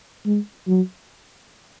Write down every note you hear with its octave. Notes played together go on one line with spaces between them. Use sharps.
G#3
F#3